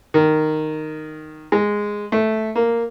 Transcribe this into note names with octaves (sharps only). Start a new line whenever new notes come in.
D#3
G#3
A3
A#3